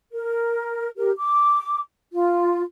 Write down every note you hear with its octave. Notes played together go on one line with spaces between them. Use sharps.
A#4
G4 A#4
D6
F4